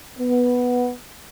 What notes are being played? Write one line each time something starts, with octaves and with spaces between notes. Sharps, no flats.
B3